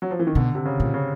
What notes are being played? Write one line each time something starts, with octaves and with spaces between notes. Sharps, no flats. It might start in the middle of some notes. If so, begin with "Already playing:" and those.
F#3
F3
E3
D#3
B2 D3
C3
C#3
A#2
C#3